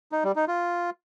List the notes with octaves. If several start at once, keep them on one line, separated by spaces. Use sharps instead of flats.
D#4
G3
D#4
F4